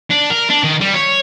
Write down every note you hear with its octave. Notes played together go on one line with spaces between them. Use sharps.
D4
A#4
D4
D#3
G3
C#5